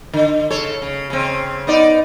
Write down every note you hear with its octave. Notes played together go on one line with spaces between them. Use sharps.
D3
C#3 A4 C#5
C#3
C#3 C4
B3 D#4 D5